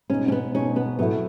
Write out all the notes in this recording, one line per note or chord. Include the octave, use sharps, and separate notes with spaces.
B2 G#3 C#4 D#4
C#4
B3
B2 G#3 C#4 D#4
B3
A2 F#3 A3 B3 E4